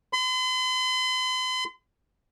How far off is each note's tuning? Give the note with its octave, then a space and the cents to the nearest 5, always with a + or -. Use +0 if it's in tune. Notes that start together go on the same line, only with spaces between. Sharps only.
C6 -45